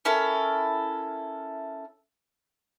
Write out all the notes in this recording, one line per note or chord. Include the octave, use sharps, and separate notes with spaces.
C#4 E4 A4 A#4